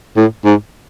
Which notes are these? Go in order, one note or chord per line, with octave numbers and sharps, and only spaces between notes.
A2
G#2